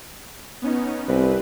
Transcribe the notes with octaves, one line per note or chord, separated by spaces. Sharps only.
B3 C#4 D#4
C2 C4 B4